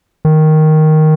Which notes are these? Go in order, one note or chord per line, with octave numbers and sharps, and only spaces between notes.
D#3